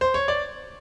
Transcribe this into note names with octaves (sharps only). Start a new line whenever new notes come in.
C5
C#5
D5